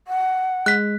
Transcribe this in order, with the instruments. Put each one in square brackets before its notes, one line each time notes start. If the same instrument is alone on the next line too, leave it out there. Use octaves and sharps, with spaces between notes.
[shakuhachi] F#5
[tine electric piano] G#3 [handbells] F#6 B6